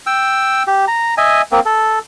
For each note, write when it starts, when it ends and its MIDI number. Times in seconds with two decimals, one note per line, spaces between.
0.07 0.63 79
0.07 0.63 88
0.67 0.85 67
0.88 1.14 82
1.17 1.42 75
1.17 1.42 76
1.17 1.42 80
1.52 1.60 58
1.52 1.60 60
1.65 1.99 69